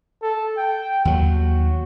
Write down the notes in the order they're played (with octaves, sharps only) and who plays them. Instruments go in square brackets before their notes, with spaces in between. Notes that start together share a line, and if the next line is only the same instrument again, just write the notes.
[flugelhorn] A4
G5
[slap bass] D#2 F#3 [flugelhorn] F#4